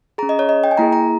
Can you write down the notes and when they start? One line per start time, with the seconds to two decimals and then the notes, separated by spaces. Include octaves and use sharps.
0.18 C#4 G#4 A#5
0.29 D#5
0.39 C#5
0.49 D#5
0.64 G5
0.71 G#5
0.77 A#3 E4 G#4 A#5
0.93 A#5